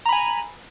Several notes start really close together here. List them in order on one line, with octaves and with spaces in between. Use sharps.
A#5 B5 G#5